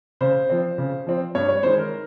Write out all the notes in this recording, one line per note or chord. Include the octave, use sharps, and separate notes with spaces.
C#3 C5
F3 C4
C#3
F3 C4
G2 C#5
C#5
D#3 G#3 C5
A#4